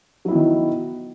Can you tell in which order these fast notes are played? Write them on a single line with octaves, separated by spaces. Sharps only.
F#3 E4 B3 D#3